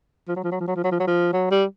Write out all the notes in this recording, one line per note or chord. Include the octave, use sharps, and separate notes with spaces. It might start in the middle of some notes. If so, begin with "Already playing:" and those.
F3
F#3
F3
F#3
F3
F#3
F3
F#3
F3
F#3
F3
F#3
G3